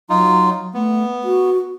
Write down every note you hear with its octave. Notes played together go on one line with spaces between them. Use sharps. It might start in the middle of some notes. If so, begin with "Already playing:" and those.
F#3 D#4 F4
A3 B3
F#4